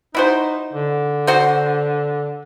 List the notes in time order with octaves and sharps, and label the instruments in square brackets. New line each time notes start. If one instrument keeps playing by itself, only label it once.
[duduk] D#4 [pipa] E4 F#4 C5
[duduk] D3
[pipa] F#4 C5